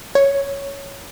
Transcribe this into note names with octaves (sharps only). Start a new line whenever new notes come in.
C#5